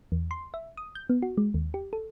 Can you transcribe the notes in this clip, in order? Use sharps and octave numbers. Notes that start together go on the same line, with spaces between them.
E2
C6
E5
D#6
G6
B3
F#4
G#3
D#2
G4
A4